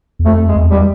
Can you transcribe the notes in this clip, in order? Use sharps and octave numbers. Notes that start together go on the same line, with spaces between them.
E2
F2 A3
G#3
E2
G3